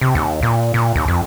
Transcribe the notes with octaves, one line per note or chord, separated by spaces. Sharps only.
C3
D#2
A#2
A#2
D#2
F2